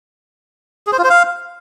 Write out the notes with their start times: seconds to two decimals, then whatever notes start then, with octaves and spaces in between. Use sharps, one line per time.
0.87 G#4
0.92 C5
0.98 F4
1.04 C5
1.10 F5